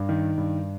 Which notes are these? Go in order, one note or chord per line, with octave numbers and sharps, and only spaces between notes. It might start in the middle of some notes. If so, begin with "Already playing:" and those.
Already playing: G2
D#3
G2